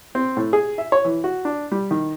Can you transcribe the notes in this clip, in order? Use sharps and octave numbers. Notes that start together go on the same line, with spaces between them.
C4
A2
G#4
E5
C#5
E3
F#4
D4
G3
D#3